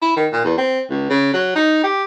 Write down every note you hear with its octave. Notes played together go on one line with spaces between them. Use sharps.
E4
D#3
A#2
E2
C4
C#2
C#3
F#3
D#4
G4